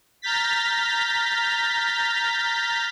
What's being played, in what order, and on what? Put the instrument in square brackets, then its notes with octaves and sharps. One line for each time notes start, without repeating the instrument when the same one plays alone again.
[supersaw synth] A#5 F6 G6 A6 B6